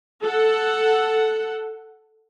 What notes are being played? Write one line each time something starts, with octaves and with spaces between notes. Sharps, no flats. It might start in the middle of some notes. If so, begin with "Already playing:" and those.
A4 F#5